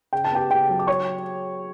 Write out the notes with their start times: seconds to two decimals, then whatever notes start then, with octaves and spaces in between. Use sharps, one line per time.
0.13 C#3 G5
0.25 A5
0.31 B3 G4 G5
0.50 C#3 G4 G5
0.69 F#3
0.79 D6
0.87 C#5 C#6